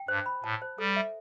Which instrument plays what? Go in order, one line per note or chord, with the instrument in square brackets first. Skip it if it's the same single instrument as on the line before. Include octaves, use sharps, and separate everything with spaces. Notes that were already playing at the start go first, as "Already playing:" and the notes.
Already playing: [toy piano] G5
[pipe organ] G2 [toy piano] C5
[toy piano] B5
[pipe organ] A2 [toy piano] A5
[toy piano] C5
[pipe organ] G3 [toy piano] A4
[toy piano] E5